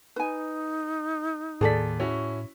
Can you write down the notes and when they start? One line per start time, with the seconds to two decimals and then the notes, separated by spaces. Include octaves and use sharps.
0.16 D#4 B4 G#5
1.61 D#2 A2 G#4 A4 D5 B6
2.00 C#4 E4 F#4